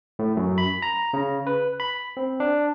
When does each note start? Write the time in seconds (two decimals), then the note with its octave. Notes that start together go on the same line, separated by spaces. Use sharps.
0.19 A2
0.37 F#2
0.58 B5
0.82 A#5
1.13 C#3
1.47 B4
1.80 B5
2.17 C4
2.40 D4